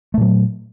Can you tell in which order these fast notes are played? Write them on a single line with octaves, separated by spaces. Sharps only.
A3 A#2 F#3